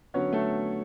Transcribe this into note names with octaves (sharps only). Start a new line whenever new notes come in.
D3 F#3 B3 C#4 C#5
A3 A4